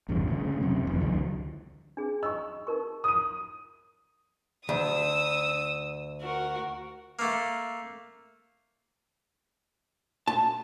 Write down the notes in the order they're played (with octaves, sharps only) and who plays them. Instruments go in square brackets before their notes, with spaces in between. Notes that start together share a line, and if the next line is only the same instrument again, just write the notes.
[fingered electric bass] A1 E2 G2 C3
D2 C#3
F#2 C3
F1 E2
C#2 D3 E3 F#3
[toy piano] D4 G#4
[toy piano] D#5 C#6 [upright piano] E6
[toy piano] D#4 A#4 C#6
[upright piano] D#6 D#7
[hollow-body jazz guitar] D2 [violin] D#6 E6
[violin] F#4 A#4
[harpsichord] A3 A#3
[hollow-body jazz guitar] A5